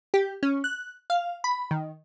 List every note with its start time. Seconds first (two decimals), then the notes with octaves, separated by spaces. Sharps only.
0.14 G4
0.43 C#4
0.64 F#6
1.10 F5
1.44 B5
1.71 D#3